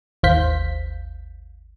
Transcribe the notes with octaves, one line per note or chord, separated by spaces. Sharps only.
G#1 D#2 C5 F5 G6 B6